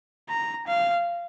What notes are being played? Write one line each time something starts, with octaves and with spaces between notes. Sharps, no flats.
A#5
F5